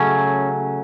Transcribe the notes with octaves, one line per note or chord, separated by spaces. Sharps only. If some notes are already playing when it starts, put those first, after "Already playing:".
Already playing: C#3 F#3 A3 C#4